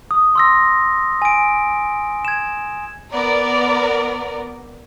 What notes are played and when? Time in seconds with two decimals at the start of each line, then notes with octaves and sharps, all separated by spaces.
0.11 D#6
0.35 C6 E6 A#6
1.22 G#5 D7
2.25 G#6 E7
3.12 B3 A#4 D5 A#5